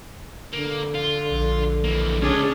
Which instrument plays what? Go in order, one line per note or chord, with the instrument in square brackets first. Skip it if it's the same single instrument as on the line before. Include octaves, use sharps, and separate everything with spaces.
[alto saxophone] D3 [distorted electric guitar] A#3
[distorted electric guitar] F4
[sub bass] A#1
[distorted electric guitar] E3 A#3
[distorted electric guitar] C#2 F4 [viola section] C#4 D4 G#4